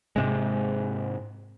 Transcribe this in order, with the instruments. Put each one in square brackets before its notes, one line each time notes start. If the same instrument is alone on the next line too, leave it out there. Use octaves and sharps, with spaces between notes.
[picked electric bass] G#2 C3 G#3